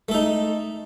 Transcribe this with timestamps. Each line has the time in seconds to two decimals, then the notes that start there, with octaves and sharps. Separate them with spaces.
0.09 A3
0.11 A4
0.14 D#4